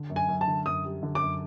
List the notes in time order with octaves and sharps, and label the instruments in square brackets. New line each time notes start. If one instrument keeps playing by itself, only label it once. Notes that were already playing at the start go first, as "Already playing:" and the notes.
Already playing: [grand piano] D3
F#2
[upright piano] G#5
[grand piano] F#2
[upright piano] A5
[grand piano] D3
[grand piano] F#2 [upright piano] D#6
[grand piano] G3
D3
[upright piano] D6
[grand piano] F#2